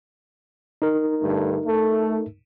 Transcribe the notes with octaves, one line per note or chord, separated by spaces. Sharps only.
D#4 A#4
G2 D3 A3
A3